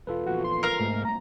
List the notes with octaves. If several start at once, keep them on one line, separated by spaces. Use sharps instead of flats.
E1 F4 A4 B4
A#1 E2 F#4
C6
A#4 F5
C2 G#2 A3 A#3
A#5